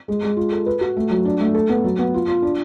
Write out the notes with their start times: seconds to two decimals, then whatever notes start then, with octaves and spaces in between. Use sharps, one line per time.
0.08 G#3
0.23 G#3
0.37 F4
0.52 A4
0.66 B4
0.81 F#4
0.97 A3
1.11 F#3
1.25 D4
1.40 A3
1.55 A4
1.70 B3
1.84 F#3
1.99 B3
2.14 F4
2.28 F4
2.42 D4